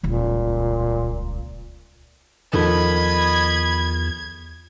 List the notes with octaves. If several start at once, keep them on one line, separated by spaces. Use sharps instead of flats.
D#1 C#2 A#2
E2 D#3 F3 A4 D#5 B5 G#6